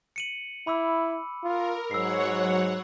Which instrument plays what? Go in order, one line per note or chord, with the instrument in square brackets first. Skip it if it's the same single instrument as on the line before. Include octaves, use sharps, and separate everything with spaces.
[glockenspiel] C#7 D#7 F#7
[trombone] E4 [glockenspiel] B5 D6 E6
[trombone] F4 [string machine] A#4
[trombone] G#2 [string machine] F#3 C#5 F#5 [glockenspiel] E6 C7